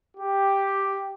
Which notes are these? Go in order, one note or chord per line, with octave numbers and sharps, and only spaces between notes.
G4